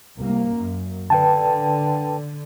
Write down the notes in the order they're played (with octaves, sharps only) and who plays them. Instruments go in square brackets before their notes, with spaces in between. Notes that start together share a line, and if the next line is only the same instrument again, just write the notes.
[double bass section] C2 A#3
F#2
[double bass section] D3 [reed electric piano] B4 G5 A5